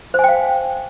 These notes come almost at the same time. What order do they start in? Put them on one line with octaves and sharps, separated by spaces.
C5 G#5 G5 F5